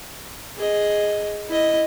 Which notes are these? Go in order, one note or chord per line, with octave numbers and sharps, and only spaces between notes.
G#4 D#5
E4 D#5